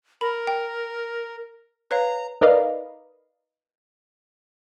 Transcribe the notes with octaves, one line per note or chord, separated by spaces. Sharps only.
A#4 B5
G5
B4 C#5 F5 A#5
D#4 A#4 B4 D5 D#5 F5